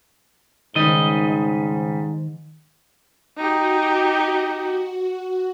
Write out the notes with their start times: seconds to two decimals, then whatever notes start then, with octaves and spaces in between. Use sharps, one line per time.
0.76 C#2 G#2 D#3 G3 D#5
3.37 D#4 F#4 G4